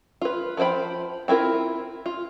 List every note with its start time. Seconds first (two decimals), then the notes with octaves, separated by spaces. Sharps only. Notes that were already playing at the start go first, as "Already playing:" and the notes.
0.21 F4 B4
0.57 F3 F4 C5 G5 B5
1.28 C4 E4 F4 A#4
2.06 F4